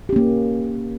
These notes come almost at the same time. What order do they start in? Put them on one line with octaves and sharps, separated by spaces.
G4 C#4 A#3